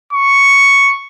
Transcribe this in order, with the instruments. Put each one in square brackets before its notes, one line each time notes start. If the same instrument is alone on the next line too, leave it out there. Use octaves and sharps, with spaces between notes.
[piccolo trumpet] C#6